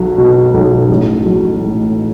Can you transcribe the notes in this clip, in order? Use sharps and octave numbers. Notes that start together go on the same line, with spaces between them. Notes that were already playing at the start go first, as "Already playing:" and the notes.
Already playing: B1 F#3
B2
B1
A1
F#3
A2